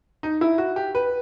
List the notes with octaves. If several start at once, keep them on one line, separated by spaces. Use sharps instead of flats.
D#4
E4
F#4
G4
B4